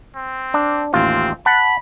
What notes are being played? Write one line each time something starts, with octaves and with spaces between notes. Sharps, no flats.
C4
D4
A1 D#2 C4 F4
F#5 A5 B5